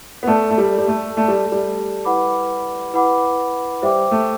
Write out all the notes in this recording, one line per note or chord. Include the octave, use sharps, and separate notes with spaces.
B3
A3 A4 D5 A5
A3
G3
G3
A3
A3 A4 D5 A5
G3
G3
E4 B4 F#5 B5 D6
E4 B4 F#5 B5 D6
G3 C5 E5 G5 D6
A3